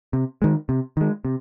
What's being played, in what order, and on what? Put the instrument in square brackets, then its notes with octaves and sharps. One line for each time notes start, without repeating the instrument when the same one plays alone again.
[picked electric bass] C3
D#3 G#3
C3
D#3 G#3
C3